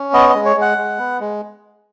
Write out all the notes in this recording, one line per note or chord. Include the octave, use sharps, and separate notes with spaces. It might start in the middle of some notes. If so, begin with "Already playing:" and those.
Already playing: C#4
B3 D#5
D#5
G#3
C#5
G#3 F#5
G#3
B3
G#3